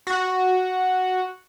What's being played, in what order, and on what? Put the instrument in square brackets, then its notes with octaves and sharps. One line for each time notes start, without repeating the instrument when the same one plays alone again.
[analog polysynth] F#4